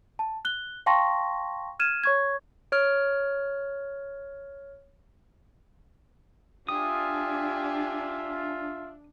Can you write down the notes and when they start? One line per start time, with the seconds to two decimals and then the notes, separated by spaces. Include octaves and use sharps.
0.19 A5
0.45 F#6 G7
0.86 F5 G5 A5 C6 C#6 A#6
1.80 F6 G#6 D#7 E7
2.04 C#5 C#6 G#6
2.72 C#5 F6
6.69 D4 F4 G4 E5 G#5 D#6